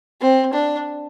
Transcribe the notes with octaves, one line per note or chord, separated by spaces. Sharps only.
C4
D4